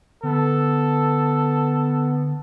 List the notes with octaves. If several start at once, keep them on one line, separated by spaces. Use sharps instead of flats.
D3 B3 A4